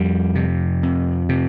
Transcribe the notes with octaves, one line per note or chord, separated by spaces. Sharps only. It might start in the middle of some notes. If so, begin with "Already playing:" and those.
Already playing: F2 G3
C3
F2
C3